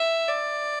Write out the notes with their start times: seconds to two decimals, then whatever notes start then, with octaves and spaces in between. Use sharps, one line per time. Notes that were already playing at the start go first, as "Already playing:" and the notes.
Already playing: E5
0.28 D5